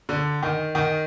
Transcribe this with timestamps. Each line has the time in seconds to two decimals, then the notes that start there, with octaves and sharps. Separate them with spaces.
0.09 D3
0.43 D#3
0.75 D#3